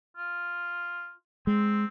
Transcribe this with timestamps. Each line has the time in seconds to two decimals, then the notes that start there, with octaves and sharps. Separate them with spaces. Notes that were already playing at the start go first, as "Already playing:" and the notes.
0.17 F4
1.47 G#3 C4